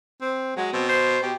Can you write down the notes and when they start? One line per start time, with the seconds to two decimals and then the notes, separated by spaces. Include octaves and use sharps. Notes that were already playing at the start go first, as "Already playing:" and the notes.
0.21 C4
0.56 F#3 G#3
0.73 B2 C4
0.89 C5
1.23 B2 G4